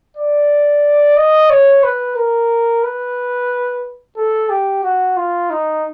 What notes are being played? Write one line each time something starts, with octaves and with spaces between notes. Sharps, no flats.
D5
D#5
C#5
B4
A#4
B4
A4
G4
F#4
F4
D#4